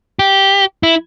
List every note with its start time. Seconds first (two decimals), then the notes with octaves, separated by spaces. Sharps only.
0.19 G4
0.83 E4